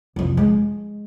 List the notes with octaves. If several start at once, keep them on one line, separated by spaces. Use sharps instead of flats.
F1 F3
G#3